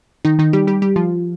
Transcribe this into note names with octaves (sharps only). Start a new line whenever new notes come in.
D#3 D#4
D#3 D#4
G3 G4
G3 G4
G3 G4
F3 F4